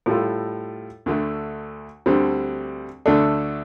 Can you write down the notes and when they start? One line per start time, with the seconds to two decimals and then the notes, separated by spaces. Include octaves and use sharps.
0.06 A2 G3 F4 A4
1.06 D2 D3 A3
2.06 D2 D3 G3 C4
3.06 D2 D3 A3 D4 A4